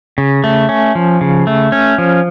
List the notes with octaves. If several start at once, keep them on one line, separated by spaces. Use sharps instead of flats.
C#3
A3
C#4
F3
C#3
A3
C#4
F3